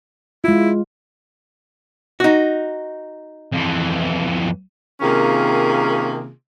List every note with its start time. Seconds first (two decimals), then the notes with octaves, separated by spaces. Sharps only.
0.44 G#3 E4 F4
2.20 D#4 F#4
3.53 F2 E3
5.01 C3 D#3 A#3 C#4 F4 G#4